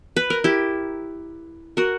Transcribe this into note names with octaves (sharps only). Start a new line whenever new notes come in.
B4
A#4
E4 G4
F#4 A#4